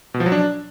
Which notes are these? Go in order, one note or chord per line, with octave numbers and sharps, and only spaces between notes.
B2
F3
F#3
D4